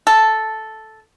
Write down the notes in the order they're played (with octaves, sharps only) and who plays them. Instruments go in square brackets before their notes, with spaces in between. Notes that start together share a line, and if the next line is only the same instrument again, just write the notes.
[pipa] A4